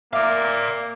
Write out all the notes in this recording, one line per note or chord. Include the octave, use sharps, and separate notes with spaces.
A#3 D5 E5 F5 D6